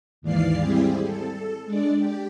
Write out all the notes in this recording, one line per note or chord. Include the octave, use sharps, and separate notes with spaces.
D#2 G#2 E3 D5 F5 C7
G3 C4 E4 G4 G#4
A4
G#3 D4 D5
G4